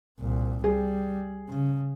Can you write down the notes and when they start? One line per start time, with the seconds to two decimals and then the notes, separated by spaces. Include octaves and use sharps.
0.20 C2 A#2
0.64 G3 G#4
1.49 C#3